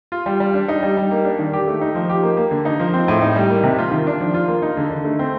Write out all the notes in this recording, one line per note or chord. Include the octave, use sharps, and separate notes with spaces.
F4
G3
G3
D4
D#4
G3
G3
A#3
D4
D#3
G4
A3
D#4
F3
G4
A#3
A#3
D3
D#4
F3
C4
A2
D#4
G3
A#3
C3
F4
D#3
D4
F3
F4
A#3
D#4
D3
D3
A3
C4